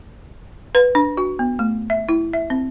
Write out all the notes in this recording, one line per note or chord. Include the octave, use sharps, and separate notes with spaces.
B4
D4
F#4
B3
A3
E5
E4
E5
C4